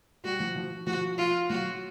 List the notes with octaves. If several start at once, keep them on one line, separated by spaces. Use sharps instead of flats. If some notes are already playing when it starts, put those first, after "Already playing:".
G3 F#4
F3
F3
F3 F#4
F4
F#3 F#4